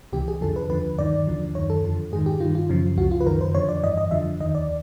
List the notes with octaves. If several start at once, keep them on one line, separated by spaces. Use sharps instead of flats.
C#2 C3 E3 G4
G#4
F2 D3 F3 A4
B4
D#2 D3 F3 B4
G2 D#3 D5
D#2 D3 F3
F#2 D#3 C#5
A4
F2 D3 F3
G#2 D#3 G#4
G4
G2 D#3 F4
F4
F#2 C#3 F3
C#2 C#3 F3 F#4
F4
B4
F#2 D#3 A#4
C5
F2 D3 F3 C#5
D5
G2 E3 D#5
D#5
F2 D3 F3 E5
D#2 D#3 D#5
D5